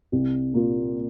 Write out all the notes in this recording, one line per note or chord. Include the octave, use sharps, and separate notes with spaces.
C2
A#2 A#3 F4